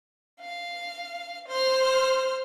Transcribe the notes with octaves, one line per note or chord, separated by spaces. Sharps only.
F5
C5 F6